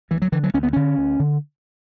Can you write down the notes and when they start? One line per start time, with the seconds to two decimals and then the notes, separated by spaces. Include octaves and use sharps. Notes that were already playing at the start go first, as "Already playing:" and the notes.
0.11 D2 E3
0.22 F#3
0.32 D3 E3
0.43 F#3
0.54 D2 C#4
0.63 B3
0.73 D3 C#4
0.97 D2
1.19 D3